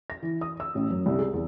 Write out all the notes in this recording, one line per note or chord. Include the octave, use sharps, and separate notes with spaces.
A#6
E3
D#6
E6
A1
F#2
C2
G#4
E2